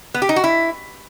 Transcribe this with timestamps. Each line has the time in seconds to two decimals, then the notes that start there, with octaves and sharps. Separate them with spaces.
0.14 B3
0.22 G4
0.29 D#4
0.36 F#4
0.44 E4